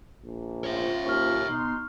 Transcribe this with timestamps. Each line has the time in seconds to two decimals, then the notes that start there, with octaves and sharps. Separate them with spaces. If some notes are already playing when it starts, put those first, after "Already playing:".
0.24 A#1
0.64 C#4 F4 C5 C#5 E5
1.06 D#2 C#6 F6
1.48 B2 D#4 C6